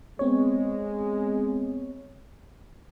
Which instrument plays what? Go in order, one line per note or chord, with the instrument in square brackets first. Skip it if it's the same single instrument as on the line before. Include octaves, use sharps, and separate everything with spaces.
[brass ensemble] G#3 [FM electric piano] B3 C4 C#5